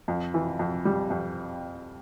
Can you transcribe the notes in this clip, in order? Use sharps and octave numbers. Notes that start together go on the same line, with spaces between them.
F2
E3
F2
G3
F2